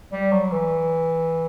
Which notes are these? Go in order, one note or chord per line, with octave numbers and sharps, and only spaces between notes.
G3
F#3
E3